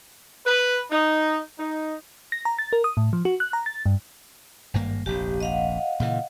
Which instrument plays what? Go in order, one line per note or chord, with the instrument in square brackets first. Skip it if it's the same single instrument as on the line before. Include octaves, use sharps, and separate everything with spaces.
[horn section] B4
D#4
D#4
[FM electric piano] A#6
A#5
A6
A#4
D#6
A2
F3
F#4
F#6
A#5
A6
G2
[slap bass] G#1 G2 A#3
[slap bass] F1 A#1 [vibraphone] G4
[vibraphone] D#5 F5 F#5
[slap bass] A#2 C#3 E3